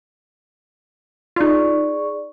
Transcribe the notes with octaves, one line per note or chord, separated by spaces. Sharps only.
D#4 F4 G#4 D5 C#6